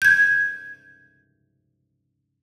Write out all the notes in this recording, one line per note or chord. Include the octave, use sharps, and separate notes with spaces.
G6 G#6